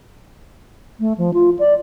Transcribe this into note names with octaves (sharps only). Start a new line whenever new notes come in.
A3
F3
F4
D5